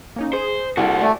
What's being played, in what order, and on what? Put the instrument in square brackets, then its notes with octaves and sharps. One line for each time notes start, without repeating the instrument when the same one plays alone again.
[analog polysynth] A#3 C#4 D#4
[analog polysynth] G#4 [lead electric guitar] C5
[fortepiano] C2 [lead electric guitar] F#4 A4
[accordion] A3 [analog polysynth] D5 G#5